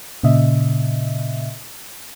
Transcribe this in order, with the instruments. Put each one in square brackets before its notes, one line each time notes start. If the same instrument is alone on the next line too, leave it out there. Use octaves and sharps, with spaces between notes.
[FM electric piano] A#2 C#3 D#5 E5